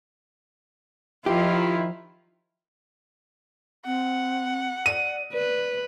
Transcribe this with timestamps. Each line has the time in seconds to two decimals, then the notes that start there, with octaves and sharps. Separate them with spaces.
1.26 D#3 F3 E4 F4 G4
3.86 C4 F#5
4.86 D5 D#7
5.33 B4 D5